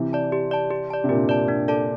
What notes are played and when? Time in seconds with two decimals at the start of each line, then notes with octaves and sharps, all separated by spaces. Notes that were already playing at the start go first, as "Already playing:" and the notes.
Already playing: C3 E3
0.13 D5 A5
0.32 G4
0.51 D5 A5
0.71 G4
0.90 D5 A5
1.04 C3
1.09 A#2 D3 G4
1.29 D5 A5
1.48 D4
1.68 A4 D5 A5